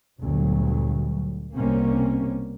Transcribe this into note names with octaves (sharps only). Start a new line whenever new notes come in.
G1 D2 A#2 F#3
C2 B2 G3 A#3 C4 C#4